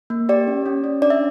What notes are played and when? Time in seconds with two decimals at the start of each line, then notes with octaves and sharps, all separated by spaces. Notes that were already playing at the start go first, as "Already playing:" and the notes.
0.10 A#3
0.29 G4 D5
0.47 C#4
0.66 C#4
0.84 C#4
1.02 D4 D5
1.10 E5